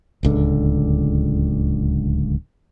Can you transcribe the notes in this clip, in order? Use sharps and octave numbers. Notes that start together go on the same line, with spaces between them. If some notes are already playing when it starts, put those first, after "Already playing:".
D1 C#2 D3